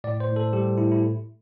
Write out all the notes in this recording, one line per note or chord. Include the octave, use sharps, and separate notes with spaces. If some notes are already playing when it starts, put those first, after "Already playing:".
A2 D5
C5
A2
A4
G3 G4
A2 E4
E4